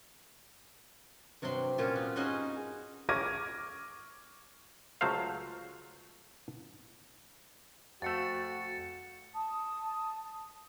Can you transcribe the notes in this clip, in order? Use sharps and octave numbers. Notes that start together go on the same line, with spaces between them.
G2 C3 F#3 G5 C6
A#2 C#4 F4
B3
C#4 D#4 F#4 G#4 D#5 C6
C#6 D6 F6 G#6 A#6 D#7
C#2 F#3 A3 C5 F5
F2 A3 F#4 A6 C#7 E7
A5 D#6